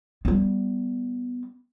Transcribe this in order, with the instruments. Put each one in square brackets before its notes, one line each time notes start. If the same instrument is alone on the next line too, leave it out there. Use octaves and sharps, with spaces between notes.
[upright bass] G3 B3